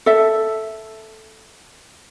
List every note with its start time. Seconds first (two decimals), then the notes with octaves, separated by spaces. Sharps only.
0.06 A4 E5